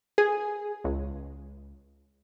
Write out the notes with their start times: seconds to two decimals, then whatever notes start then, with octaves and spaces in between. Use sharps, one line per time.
0.18 G#4
0.84 C#2